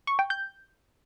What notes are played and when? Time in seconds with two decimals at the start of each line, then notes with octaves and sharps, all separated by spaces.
0.07 C#6
0.19 G5
0.30 G6